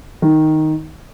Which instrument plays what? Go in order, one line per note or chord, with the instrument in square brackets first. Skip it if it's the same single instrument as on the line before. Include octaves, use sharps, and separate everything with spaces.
[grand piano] D#3